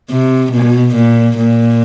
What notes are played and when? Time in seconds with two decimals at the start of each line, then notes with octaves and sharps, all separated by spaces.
0.10 C3
0.52 B2
0.95 A#2
1.37 A#2